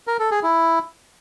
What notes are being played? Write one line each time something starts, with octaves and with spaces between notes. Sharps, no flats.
A#4
A4
G#4
E4